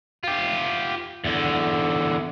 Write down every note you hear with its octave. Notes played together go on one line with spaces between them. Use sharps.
F4 G4
E2 D3